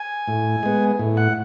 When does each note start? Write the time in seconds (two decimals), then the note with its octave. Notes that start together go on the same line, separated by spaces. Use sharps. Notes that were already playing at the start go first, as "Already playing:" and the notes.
Already playing: G#5
0.28 A2
0.63 G#3 B3
0.99 A2
1.17 F#5